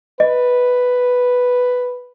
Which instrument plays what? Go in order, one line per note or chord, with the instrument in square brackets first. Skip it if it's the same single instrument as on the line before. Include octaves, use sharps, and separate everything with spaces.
[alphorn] B4 [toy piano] D#5